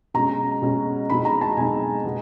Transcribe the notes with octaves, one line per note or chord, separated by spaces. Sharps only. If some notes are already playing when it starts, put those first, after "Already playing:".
B2 G#3 C#4 A#5
B2 G#3 C#4
B2 G#3 C4 D#4 B5
A#5
A5
B2 G#3 C4 D#4 G#5
B2 G#3 B3